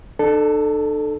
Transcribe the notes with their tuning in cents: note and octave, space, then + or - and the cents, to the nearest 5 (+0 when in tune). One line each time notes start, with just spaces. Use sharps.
D4 +45 A4 +0